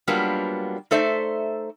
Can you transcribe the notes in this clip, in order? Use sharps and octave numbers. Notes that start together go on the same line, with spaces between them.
F#3 G3 A#3 B3 D4 F4
A3 D#4 A4 C5 D5 E5